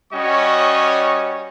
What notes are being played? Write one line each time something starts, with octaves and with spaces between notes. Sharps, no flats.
G3 C#4 F#4 C#5 D#5 C#6